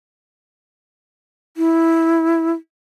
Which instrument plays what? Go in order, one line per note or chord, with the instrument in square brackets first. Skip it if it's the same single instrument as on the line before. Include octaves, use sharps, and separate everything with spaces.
[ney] E4